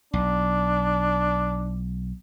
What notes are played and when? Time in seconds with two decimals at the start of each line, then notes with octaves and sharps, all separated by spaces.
0.13 B1 D4